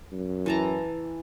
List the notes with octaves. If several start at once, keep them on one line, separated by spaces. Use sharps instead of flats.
F#2
E3 A5 A#5